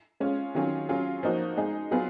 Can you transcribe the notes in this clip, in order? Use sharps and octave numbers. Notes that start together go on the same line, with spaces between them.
G#3 C#4 F4
D#3 F#3 C#4 F4 G#4
F#3 C#4 F4 G#4
F3 A#3 D#4 F#4
G#3 D#4 G#4
F#3 B3 F4 G#4